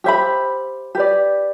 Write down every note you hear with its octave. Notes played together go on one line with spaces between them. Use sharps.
G4 C5 E5 B5
G4 B4 D5